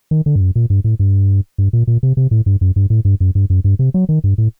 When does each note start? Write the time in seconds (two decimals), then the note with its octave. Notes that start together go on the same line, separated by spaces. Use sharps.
0.11 D#3
0.26 D3
0.36 G2
0.41 F#2
0.56 A#2
0.70 G2
0.84 A2
0.99 G2
1.58 G2
1.73 A#2
1.87 A#2
2.03 C3
2.17 C3
2.31 A2
2.46 G2
2.61 F#2
2.76 G2
2.90 A2
3.05 G2
3.20 F#2
3.35 G2
3.50 F#2
3.64 G2
3.79 C3
3.94 F#3
4.09 D#3
4.24 G2
4.38 A2